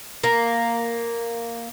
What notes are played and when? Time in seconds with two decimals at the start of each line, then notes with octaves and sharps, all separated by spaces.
0.24 A#3